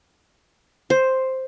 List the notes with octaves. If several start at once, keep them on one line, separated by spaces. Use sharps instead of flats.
C5